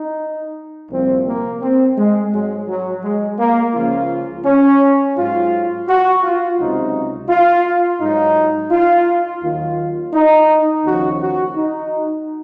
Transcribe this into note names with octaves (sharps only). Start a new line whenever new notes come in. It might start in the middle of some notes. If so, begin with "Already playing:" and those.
Already playing: D#4
C2 A#2 F3 C4
A#3
C4
G#3
G#2 F#3 G#3
F#3
G#3
A#3
C#2 C#3 F3 F4
C#4
G#2 F#3 F4
F#4
F4
C#2 C3 F#3 D#4
F4
G#2 F#3 D#4
F4
D#2 D#3 F#3 F4
D#4
D#2 C#3 F3 F#4
F#4
D#4